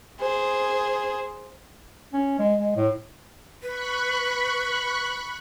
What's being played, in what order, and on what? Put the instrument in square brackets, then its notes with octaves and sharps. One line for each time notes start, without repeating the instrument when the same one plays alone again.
[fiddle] G#4 C5
[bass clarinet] C#4
G#3
G#3
A2
[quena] B4 [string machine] B5 C#6 F#6